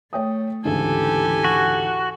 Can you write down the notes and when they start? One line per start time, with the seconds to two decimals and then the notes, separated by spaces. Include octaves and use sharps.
0.13 A3 C#5 G5 D#6
0.65 D2 G#2 C#3 E3 G4 A4 G#5
1.44 F#4